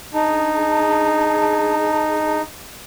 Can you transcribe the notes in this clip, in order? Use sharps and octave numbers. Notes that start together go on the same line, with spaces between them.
D4 D#4 G#4 A5